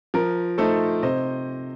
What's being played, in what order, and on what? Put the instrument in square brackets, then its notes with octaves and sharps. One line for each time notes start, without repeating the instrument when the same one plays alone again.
[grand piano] F3 A#4
A3 D#4 A4 C5
C3 C5 D#5